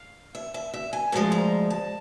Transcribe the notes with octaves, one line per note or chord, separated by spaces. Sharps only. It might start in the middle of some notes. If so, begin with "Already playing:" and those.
Already playing: F5
E5
E5
E5
G#5
D2 C#3 F3 G#3 A5
A#5
A5